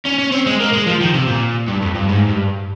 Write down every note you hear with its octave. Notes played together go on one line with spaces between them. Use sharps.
C#4
C#4
C4
G#3
A#3
G#3
F3
D#3
C3
A#2
G2
F2
G2
G#2
G2